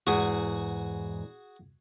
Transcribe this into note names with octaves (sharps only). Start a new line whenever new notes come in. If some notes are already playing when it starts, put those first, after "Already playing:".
E2 G#2 F#4 G#4